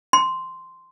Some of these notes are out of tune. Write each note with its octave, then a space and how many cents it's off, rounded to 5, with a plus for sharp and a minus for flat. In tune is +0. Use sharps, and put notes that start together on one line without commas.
C6 -5